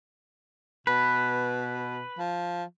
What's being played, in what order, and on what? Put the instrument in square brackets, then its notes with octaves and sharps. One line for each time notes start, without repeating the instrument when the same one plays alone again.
[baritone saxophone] B2 [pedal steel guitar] B4
[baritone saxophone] F3